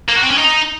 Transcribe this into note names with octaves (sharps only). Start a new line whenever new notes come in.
A#3
F#4
C4
C#4
D#4